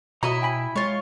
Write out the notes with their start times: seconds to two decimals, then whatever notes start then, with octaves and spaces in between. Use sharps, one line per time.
0.23 B2 E4 F#4 C#5 D#5 E5 A#5
0.42 G5 G#5 B5
0.76 G#3 F4 C#5